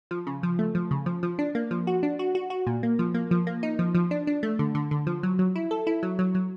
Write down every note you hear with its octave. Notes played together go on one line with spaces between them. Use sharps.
F3
C#3
F3
A3
F3
C#3
F3
F3
D4
A#3
F3
F#4
D4
F#4
F#4
F#4
A#2
A#3
F3
A#3
F3
A#3
D#4
F3
F3
D4
D4
A3
D3
D3
D3
F3
F#3
F#3
E4
A4
E4
F#3
F#3
F#3